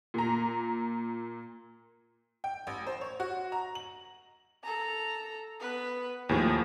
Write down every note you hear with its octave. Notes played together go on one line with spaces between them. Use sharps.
A#2 A#5
G5
A1
C5
C#5
F#4
A#5
F#7
A4 A#5
B3 B4
D#2 A2 F3 G#4